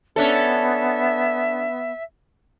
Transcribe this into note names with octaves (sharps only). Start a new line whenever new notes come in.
B3 C#4 D4 A4 E5